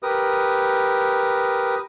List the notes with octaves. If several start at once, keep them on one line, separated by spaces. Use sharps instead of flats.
G4 A#4 B4 D#6